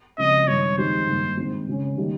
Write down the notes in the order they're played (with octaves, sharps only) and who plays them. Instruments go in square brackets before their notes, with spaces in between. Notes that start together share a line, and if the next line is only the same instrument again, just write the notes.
[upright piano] C#3 F3 G#3 C4 [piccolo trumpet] D#5
[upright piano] G2 D#3 G#3 [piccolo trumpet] C#5
[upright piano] F2 D#3 G#3 D#4 G4 [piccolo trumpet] C5
[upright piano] G2 D#3 A#3 D#4
G#2 D#3 G#3 C4 D#4
C#3 G#3 C#4
D#3 G3 A#3